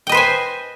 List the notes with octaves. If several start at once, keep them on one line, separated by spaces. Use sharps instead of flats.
B4 C5 D#5 G5 G#5